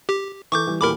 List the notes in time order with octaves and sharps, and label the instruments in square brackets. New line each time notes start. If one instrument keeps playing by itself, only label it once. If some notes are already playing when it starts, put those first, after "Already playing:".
[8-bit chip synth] G4
[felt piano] E3 A4 [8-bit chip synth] C#6 D6 G6
[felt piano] E3 G3
[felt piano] D#1 E3 G4 [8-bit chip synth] A#4 B5 D6